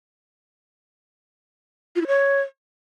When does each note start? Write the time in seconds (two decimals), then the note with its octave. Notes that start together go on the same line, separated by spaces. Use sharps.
1.96 F4
2.01 E4
2.07 C#5